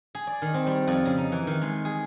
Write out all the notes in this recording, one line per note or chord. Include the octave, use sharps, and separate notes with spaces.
G#4
D5
D#3
C4
G3
F2
C#3
D#4
E3
D#3
G#3
G#4